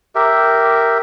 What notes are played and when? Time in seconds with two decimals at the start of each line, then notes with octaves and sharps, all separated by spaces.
0.15 G4 A#4 E5